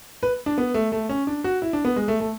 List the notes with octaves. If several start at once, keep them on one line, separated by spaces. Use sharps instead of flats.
B4
D4
B3
A3
A3
C#4
D4
F#4
E4
D4
B3
G#3
A3
A3